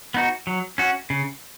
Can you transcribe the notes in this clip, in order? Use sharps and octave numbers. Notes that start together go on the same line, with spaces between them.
B3 D#4 F#4
F#3
C#4 F#4
C#3